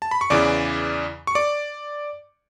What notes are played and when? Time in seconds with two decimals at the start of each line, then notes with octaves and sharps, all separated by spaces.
0.02 A5
0.11 B5
0.21 C#6
0.30 E2 C#3 E3 D5 D6
1.27 C#6
1.35 D5 D6